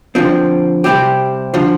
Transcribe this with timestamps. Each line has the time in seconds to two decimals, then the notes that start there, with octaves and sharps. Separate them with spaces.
0.15 D3 F3 C4
0.84 C3 G3 C4 E4 G4
1.54 D3 F3